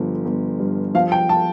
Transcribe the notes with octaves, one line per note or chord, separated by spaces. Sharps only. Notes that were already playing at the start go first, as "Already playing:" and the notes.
Already playing: G1 F3
G1
G2
F3 F5
G5
A5